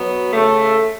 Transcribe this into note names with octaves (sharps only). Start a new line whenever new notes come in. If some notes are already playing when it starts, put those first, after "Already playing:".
Already playing: B2 F#3 B3
C#3 A3